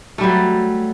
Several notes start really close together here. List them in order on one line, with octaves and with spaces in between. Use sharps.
A3 G3 F#3